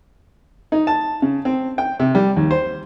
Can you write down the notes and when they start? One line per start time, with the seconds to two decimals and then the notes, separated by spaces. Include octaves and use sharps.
0.72 D#4
0.87 A5
1.22 C#3
1.45 C4
1.78 G5
2.00 C3
2.15 G3
2.36 D#2
2.51 C5